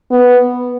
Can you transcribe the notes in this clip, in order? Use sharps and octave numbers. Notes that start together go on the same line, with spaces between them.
B3